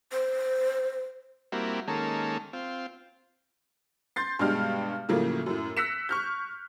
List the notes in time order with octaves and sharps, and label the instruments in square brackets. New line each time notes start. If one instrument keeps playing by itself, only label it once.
[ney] C5
[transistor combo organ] G3 A#3 C4 E4 F#4
D#3 G#3 A#3 C#4 A4
C4 F4
[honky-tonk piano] C6 G6 A6 C7
G2 B2 G#3 D4 G4 F6
A2 C#3 F3 F#3 A3 A#3
F#2 A2
E6 F#6 A#6 B6 C#7 E7
C#6 F6 G6